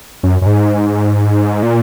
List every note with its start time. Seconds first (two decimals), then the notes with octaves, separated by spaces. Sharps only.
0.23 F#2
0.41 F#2
0.46 G#2
1.63 A#2